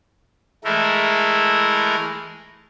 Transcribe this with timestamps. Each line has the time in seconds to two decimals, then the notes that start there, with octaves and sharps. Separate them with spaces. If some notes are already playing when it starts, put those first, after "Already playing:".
0.64 E3 G#3 A3 E4 A#4